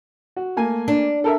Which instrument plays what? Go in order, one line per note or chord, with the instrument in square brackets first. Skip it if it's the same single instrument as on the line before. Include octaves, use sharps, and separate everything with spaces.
[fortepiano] F#4
A3 A#3 G#5
[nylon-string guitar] D4
[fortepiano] A4 A#4 E5